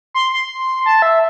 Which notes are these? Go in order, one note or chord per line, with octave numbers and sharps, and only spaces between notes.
C6
C6
A5
E5